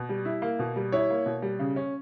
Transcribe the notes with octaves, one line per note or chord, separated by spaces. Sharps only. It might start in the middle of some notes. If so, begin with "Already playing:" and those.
Already playing: B2
G3
E4
A#3
B2
G3
E4 C#5
A#3
B2
G3
C#3
C#4